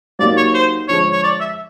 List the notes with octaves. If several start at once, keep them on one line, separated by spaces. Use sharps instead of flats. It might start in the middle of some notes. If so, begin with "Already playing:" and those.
F#3 A#3 D#4 G4 D5
C#5
C5
D3 F3 G#3 C#5
C#5
D5
E5